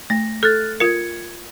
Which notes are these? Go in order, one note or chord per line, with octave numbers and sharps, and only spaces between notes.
A3 A#6
A4 F6 F#6 A6
F4 A#4 G#6 C#7